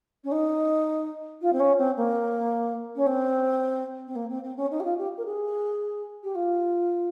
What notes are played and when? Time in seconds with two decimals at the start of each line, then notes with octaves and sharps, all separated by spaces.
0.23 C#4
0.31 D#4
1.41 F4
1.52 C4
1.59 C#4
1.78 C4
1.96 A#3
2.95 C#4
3.06 C4
4.07 C4
4.15 A#3
4.29 C4
4.43 C4
4.56 C#4
4.70 D#4
4.79 G4
4.84 F4
4.97 G4
5.17 A#4
5.25 G#4
6.23 G4
6.34 F4